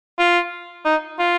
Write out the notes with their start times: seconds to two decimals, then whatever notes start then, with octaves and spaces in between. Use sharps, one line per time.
0.19 F4
0.85 D#4
1.19 F4